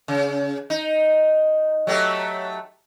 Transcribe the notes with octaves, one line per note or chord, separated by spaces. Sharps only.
C#3
D#4
F#3 A3 G4